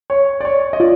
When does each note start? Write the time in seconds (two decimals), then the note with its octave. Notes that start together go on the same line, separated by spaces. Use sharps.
0.10 C#5
0.41 D5
0.45 C#5
0.73 D#5
0.80 F4 D5